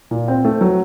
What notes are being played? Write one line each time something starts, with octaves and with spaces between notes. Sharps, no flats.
A#2
C4
A3
F#3